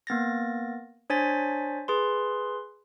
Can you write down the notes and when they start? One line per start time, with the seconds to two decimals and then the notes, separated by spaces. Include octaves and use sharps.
0.07 A#3 B3 A6 A#6
1.10 D4 C5 C#5 G#5 A6 B6
1.88 G#4 B4 C6